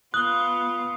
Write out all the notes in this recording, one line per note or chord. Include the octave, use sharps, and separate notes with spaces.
B3 F4 D#6 F#6 G7